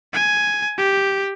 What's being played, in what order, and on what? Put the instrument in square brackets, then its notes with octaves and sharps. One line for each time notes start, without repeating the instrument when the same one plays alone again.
[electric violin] G#5
G4